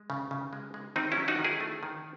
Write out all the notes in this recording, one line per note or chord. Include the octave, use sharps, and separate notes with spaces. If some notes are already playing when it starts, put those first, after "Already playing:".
Already playing: G#3
C#3
C#3
G#3
G#3
D#3 C4 D#4
C#4 E4
F#3
D#4 F#4
D#3
E4 G#4
A3
D#3